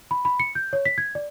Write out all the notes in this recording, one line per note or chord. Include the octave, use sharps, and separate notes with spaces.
B5
B5
C#7
G6
C#5
B6
G#6
D5